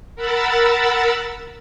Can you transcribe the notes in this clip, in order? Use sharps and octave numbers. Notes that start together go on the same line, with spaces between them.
A#4 F#5 B5 E6 A6